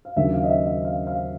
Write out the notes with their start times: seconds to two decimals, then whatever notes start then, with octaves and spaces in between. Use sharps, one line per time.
0.05 F5
0.16 D#2 C#3 F#3 A#3 D4 E5
0.33 F5
0.44 D#5
0.50 E5
0.67 E5
0.85 F5
1.07 F5